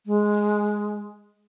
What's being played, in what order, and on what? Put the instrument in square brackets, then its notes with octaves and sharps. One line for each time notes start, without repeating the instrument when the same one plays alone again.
[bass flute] G#3